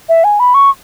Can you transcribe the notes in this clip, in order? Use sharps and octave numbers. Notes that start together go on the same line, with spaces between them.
E5
G#5
B5
C#6